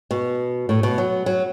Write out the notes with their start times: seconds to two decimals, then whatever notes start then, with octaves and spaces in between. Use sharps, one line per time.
0.11 B2
0.69 A2
0.83 B2
0.98 F#3
1.26 F#3